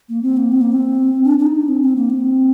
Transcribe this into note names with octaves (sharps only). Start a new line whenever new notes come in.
A#3
C4
A#3
C4
A#3
C4
D4
D4
D#4
D4
C4
C4
A#3
C4